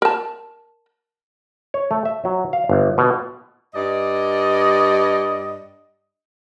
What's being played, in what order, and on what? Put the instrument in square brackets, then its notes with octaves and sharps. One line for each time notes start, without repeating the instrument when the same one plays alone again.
[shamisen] A#4 A5
[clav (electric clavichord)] C#5
A3
E5
F#3
F5
G1
B2
[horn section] G2 D5 D#5